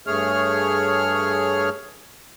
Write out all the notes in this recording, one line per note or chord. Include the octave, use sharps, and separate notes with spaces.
G2 A3 G#4 C#5 F6